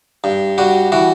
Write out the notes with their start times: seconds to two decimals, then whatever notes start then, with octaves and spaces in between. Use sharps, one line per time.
0.24 G2
0.58 G3 F#4
0.92 E3 F#4